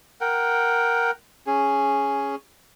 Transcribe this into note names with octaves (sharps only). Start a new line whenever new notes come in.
A#4 F#5 G5
C#4 G#4